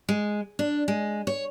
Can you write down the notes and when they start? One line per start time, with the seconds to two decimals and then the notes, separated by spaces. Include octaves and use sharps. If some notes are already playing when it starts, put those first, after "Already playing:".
0.09 G#3
0.59 D4
0.88 G#3
1.27 C#5